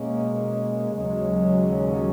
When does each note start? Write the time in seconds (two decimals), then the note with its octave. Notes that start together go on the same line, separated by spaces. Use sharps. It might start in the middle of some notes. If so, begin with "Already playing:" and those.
Already playing: B2 G#3 A#3 C#4
0.94 D#2 C#3 F#3 G#3 C#4